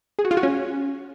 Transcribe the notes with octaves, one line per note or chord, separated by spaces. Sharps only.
G#4
F#4
F4
F#4
C#4